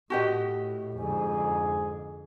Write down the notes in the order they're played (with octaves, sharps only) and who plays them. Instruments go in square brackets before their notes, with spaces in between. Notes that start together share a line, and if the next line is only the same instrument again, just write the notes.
[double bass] A2 [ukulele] F#4 G4 D#5
[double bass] F2 D3 [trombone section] G#2 G#4